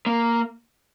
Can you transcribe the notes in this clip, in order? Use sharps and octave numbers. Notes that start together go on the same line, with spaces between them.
A#3